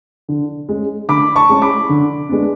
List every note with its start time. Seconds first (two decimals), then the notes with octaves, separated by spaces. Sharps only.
0.28 D3
0.69 G#3 C#4
1.08 D3 B5 D6
1.36 A5 C#6
1.49 G#3 C#4
1.62 B5 D6
1.89 D3
2.29 G#3 B3 D4